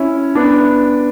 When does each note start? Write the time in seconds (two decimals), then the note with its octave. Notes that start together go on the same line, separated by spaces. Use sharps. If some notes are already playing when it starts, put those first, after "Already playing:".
Already playing: C#4 E4
0.35 B3 D4